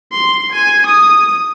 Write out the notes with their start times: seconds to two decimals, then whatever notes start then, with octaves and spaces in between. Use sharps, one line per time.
0.12 C6
0.52 G#5
0.87 D#6